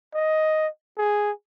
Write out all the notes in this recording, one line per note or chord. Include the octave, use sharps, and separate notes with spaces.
D#5
G#4